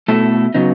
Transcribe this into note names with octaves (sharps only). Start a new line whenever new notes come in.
B2 A3 E4 A4
C#3 F#3 B3 D#4